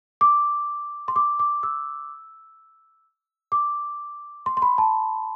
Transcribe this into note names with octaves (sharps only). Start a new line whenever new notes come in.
D6
C6
D6
D6
E6
D6
C6
C6
B5
A5